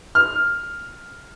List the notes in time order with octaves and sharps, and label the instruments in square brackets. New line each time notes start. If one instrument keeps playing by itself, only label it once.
[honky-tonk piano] F6